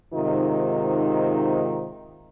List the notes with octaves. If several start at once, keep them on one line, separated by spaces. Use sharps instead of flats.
G#2 C3 D#3 D#4 F4